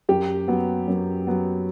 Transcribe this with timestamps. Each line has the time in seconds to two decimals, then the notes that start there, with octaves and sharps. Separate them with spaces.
0.09 F#2 G4
0.48 F#3 B3
0.88 F#2
1.27 F#3 B3